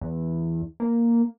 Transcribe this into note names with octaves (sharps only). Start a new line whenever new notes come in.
E2
A#3